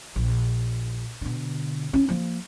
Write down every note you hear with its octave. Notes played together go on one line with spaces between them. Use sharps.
A#1
B2 D3
C#4 E4
F3 A#3